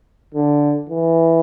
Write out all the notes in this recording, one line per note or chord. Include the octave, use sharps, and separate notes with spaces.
D3
E3